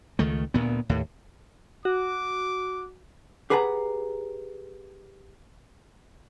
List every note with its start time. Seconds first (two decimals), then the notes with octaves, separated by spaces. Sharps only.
0.19 C#2 D#3 A3
0.54 D2 A#2 B3
0.89 D#2 A2
1.85 F#4 D6
3.50 G4 G#4 B4 F#5 G#5 A#5